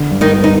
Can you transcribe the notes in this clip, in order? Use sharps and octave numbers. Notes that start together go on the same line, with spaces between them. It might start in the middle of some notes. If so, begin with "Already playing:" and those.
Already playing: D3
G2
D#3 D#4
B3
D#4